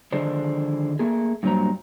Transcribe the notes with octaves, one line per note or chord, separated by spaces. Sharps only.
D3 D#3 F3 G#3 D4 C5
A3 A#3 G#4
G2 A#2 F#3 C5 A#5